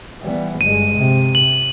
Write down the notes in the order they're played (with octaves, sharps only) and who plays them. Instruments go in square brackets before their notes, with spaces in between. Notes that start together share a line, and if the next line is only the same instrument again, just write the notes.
[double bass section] E3 G3 B3
[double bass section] G1 G2 G#3 [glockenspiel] D#7
[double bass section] C3
[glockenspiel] F#7